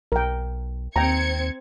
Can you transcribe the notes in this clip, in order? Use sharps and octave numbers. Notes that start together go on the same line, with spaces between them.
B1 A#4 G5
D#2 C4 G5 A#5 G#6 C#7